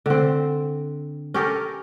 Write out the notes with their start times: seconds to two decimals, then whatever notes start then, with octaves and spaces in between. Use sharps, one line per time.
0.06 D3 C4
1.34 C#4 G4 A4 A#4